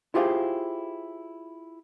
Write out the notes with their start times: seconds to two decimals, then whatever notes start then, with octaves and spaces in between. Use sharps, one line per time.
0.14 E4 F4 G4 G#4 C5 F5